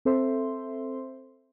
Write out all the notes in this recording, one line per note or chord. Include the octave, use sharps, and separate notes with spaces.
C4 A4 C5 E5 C6